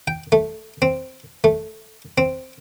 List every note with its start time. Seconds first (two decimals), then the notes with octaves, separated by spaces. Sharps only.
0.08 G5
0.32 A3
0.82 C4
1.44 A3
2.18 C4